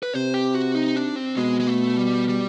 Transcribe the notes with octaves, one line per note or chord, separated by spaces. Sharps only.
B4
C3 C5
G4
F#4
D#4
D4
C4
B2 G#3
G#3
A3
G3
G3